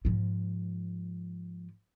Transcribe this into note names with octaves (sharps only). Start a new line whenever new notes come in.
G#2 F3